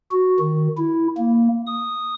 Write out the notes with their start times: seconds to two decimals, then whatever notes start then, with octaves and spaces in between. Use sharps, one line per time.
0.11 F#4
0.40 D#3
0.78 E4
1.18 A#3
1.67 D#6